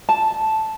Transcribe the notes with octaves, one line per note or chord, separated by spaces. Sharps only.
A5